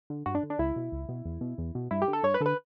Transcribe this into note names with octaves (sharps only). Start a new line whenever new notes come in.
D3
G2 F#4
D4
D3
D4
C#2 E4
B2
C#2
B2
E2
B2
E2
B2
G2 E4
G4
D3
A4
G2 C#5
B4
D3 A4
B4